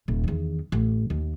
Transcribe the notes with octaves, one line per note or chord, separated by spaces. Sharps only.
D#1
E2 D#3
A1
D#2